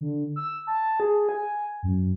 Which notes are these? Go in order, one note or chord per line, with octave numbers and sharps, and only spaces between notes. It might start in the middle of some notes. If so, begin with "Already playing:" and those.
D3
E6
A5
G#4
G#5
F#2